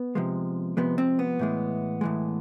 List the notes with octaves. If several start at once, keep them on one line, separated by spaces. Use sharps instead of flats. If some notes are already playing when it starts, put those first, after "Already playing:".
Already playing: B3
C3 F3 G#3
C3 F3 G#3 B3
C4
B3
A2 E3 G#3
A2 E3 G#3